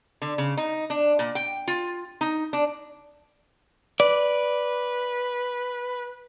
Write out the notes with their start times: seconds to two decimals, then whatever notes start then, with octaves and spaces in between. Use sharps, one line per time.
0.22 D3
0.38 C#3
0.57 D#4
0.90 D4
1.19 A#2
1.35 G5
1.68 F4
2.21 D#4
2.53 D4
4.00 B4 D5